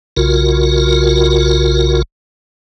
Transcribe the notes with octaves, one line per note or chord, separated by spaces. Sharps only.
B1 C#3 F4 F#4 A#4